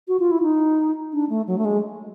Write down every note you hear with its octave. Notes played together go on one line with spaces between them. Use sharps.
F#4
F4
E4
D#4
D4
A3
F#3
A3
G#3